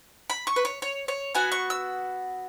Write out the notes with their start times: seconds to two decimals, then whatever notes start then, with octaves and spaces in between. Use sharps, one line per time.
0.30 B5
0.47 C#6
0.56 B4
0.65 C#5
0.82 C#5
1.08 C#5
1.35 B3 F#4 G#5
1.52 C#6
1.70 E6